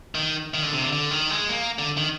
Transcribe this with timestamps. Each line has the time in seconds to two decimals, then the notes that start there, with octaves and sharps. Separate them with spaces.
0.15 D#3
0.54 D#3
0.63 D3
0.73 C3
0.82 D3
0.93 D3
1.11 D#3
1.30 G#3
1.49 A#3
1.79 D3
1.97 D#3